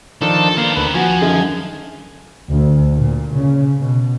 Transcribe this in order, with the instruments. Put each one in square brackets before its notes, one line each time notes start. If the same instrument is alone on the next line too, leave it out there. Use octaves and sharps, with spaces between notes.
[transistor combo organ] D#3 F3 D4 [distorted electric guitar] A4
[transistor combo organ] A#3 [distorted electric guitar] B3 C5
[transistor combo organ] D2 B4
[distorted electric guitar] F3 [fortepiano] F#4 F#5 [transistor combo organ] G#5
[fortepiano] F#2 D3 D#3
[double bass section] D2
A#2
C#3
B2